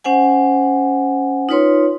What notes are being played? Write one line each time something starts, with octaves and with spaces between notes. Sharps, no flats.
C#4 C5 F#5 G#5
D#4 F4 B4 C#5 C6